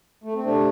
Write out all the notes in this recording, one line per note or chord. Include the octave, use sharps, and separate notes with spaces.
A3
C4
C3 A3 D4